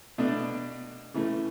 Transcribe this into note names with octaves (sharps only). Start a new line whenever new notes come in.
B2 A3 D4
C#3 E3 A3